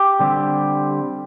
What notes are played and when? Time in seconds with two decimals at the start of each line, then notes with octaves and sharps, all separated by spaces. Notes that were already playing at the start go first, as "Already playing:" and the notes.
Already playing: G4
0.19 D3 G3 C4